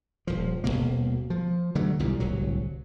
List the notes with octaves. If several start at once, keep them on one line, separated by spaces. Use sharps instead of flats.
D#1 F3
D#1 D#2 B2 A#3
F3
D3 F#3 G3 A3
B1 E2 A#2 G3
D1 C2 F#3